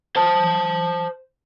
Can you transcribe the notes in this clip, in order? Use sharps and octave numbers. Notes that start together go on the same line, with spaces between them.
C5 A5